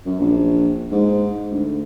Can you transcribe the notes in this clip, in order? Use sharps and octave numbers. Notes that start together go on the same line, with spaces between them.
F#2
A#1
G#2
D2